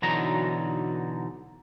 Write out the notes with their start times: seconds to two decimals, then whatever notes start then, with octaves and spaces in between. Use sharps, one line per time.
0.02 B1 D3 E3 F#3 D#4 A#5